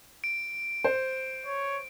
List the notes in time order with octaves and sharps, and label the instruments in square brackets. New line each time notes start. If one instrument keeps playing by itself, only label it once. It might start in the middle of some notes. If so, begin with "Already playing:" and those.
[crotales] D7
[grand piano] C5
[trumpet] C#5